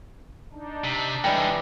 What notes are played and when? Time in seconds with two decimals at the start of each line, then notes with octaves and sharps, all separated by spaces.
0.53 D4 D#4
0.84 C3
1.24 D3 E3 G3 G#3 B3 G5